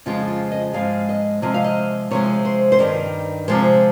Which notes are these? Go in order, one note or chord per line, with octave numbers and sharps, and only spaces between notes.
F2 C#3 F3 G#3 F4
F4
D#5
G#2 F3 G#3 F5
D#5
C3 F3 G#3 D#5
F5
D#5
C3 F3 G#3 C#5
C5
C5
G2 D#3 G3 A#4
C3 F3 G#3 C5